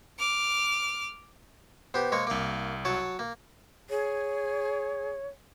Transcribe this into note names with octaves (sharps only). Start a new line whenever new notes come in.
D6 F6
B3 G4 C5
G#3 A#3 C#5
C2 A#3 F5 D6
F#3 C#5 A5
A#3
G#4 C#5